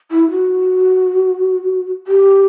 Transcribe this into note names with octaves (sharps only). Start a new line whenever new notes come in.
E4
F#4
G4